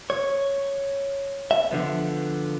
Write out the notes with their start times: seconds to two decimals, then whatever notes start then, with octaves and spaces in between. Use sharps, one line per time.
0.10 C#5
1.51 E5
1.71 D3 F3 B3